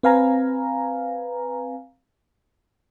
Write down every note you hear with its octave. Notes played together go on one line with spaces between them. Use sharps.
C4 B4 F5 G#5 A#5